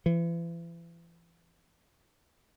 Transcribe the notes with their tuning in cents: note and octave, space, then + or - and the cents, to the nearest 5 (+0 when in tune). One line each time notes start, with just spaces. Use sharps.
E3 +40